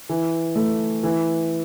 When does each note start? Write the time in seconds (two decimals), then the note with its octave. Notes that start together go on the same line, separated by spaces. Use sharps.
0.09 E3
0.56 A3
1.03 E3